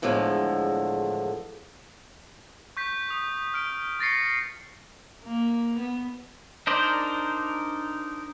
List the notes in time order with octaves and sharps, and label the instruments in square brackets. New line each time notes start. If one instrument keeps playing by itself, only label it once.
[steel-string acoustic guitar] E2 A2 D3 F3 G#3
[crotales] C#6 G6 B6
C#6 D#6
F6 D7
C#6 A6 A#6 C7 C#7
[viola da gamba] A#3
B3
[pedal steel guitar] D4 D#4 A#4 C5 D5